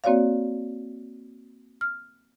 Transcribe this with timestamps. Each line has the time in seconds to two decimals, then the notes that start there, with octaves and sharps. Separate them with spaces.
0.04 A#3 C4 F#4 C#5 D5 F5
1.81 F6